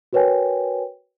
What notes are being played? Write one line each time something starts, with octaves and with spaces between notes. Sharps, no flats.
F#4 A#4 B4 C#5 G5 G#5